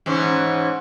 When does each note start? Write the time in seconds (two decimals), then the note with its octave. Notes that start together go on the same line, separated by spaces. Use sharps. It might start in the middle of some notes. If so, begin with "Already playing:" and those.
0.06 G#2 E3 C#4